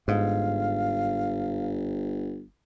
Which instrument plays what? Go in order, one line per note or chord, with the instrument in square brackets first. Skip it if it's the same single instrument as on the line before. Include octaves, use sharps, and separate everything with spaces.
[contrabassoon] G1 [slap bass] G#2 [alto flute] F5